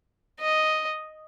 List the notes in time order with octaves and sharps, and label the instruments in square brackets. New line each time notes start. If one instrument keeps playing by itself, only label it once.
[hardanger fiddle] D#5